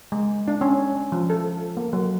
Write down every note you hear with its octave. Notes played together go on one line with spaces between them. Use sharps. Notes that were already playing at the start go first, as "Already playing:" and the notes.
G#3
D4
C#4
F3
A4
A#3
F#3